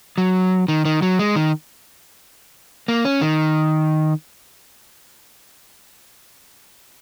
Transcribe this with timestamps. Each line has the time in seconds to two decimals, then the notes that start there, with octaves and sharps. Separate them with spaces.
0.18 F#3
0.68 D#3
0.85 D#3
1.02 F#3
1.19 G#3
1.36 D#3
2.88 A#3
3.05 C#4
3.21 D#3